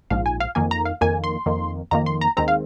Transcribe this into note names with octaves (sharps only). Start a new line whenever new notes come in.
A#1 G#2 F3 F5
G#5
F5
F2 D#3 A#3 G#5
A#5
F5
F2 D#3 A#3 G#5
C6
F2 D#3 A#3
F2 D#3 A#3 A#5
C6
A#5
D#2 D#3 G#3 C4 A#5
F5